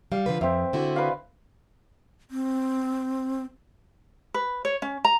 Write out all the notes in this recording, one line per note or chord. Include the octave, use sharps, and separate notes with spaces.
G3 F5
D3 F3 B4
F2 C4 E5
D3 E4 F#4
B4 D5 F5
C4
B4
C#5
C#4
A#5